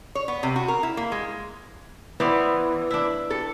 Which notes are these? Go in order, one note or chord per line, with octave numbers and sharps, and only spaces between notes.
C#5
B3
C3
F#4
A#4
E4
A#3
G#3
E3 B3 C5 D5
D4 E4
A4